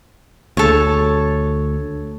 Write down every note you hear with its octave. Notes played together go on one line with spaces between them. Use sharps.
D2 A4 C#5